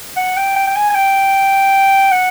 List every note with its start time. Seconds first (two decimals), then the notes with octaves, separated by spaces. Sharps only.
0.17 F#5
0.36 G5
0.56 G5
0.67 G5
0.76 G#5
0.90 G#5
0.95 G5
2.11 F#5